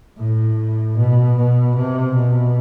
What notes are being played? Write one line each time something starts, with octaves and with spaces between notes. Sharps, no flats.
A2
B2
B2
C3
B2